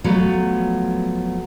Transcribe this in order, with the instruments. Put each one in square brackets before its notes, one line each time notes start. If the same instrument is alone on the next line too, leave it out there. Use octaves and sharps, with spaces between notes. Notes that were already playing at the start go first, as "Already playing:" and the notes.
[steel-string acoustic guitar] F3 F#3 A3 B3